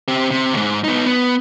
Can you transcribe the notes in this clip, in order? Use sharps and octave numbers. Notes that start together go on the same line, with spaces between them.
C4 G4
C3
D#2 G#2
B3 D#4
B3